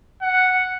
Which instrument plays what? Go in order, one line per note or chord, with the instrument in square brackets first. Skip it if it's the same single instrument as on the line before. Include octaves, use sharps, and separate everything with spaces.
[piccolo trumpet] F#5